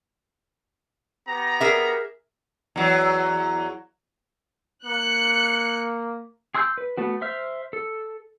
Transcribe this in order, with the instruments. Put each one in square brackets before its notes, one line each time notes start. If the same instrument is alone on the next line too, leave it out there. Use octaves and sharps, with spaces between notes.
[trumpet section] B3 G4 A#5
[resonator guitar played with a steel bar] G#4 A#4 E5
[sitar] E2 F#3
[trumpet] A#3 [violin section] F#6 C#7
[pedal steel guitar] G#4 C6 E6 F#6 G6
B4
A3 B3 F#4
C5 E5 F6
A4